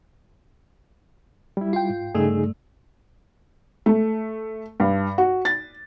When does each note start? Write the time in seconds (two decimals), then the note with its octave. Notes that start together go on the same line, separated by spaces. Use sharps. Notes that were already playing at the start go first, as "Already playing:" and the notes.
1.57 G3 E4
1.73 F4 G5
1.90 G#2
2.15 G2 C#3 A3 D#4 G#4
3.86 A3
4.80 G2
5.18 F#4
5.45 A6